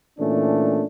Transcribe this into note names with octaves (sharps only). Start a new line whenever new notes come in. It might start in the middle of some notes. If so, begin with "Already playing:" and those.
A#2 E3 A3 C#4 D4